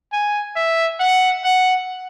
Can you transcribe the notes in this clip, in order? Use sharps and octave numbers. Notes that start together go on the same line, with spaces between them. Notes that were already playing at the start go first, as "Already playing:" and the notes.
G#5
E5
F#5
F#5